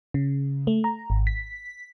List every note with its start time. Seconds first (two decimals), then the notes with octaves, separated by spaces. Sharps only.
0.14 C#3
0.67 A3
0.84 A#5
1.10 G#1
1.27 B6